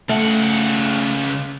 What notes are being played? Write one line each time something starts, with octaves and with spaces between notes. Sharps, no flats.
C#2 A3 F#5